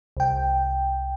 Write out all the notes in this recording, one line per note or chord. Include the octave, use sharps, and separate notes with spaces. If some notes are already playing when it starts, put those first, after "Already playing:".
C2 G5